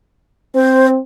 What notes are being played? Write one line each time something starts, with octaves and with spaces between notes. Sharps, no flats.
C4 C5